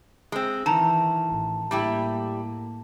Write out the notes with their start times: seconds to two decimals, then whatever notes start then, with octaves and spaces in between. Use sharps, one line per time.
0.32 G#3 C4
0.66 D#3 E3 A5 A#5
1.27 A1
1.71 A2 G3 A#3 E4 G4